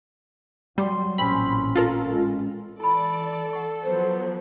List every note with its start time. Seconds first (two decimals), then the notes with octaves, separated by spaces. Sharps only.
0.78 F#3 G3 C6
1.18 A1 A#2 C4 C#4 B5
1.76 F4 A4 A#4
2.09 G#3
2.80 E3 E4 A4 D5 B5
3.53 F#5 C#6
3.83 F3 F#3 B3 C5